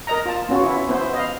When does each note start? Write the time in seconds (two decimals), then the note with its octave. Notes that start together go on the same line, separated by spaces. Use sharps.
0.07 A#4 D#5 A#5
0.26 F4 A5
0.49 B3 C#4 F4 F#4
0.63 E4
0.89 B3 E4 C5
1.13 D#5 F5